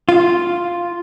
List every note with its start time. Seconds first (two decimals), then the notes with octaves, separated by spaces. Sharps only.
0.09 F4